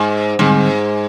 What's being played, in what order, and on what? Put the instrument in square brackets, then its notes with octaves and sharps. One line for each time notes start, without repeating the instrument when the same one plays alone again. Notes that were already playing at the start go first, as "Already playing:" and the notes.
Already playing: [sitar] G#2
[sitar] G#2 [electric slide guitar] D3 G3 C4